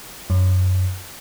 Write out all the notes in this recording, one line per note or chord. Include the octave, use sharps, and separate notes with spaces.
F#2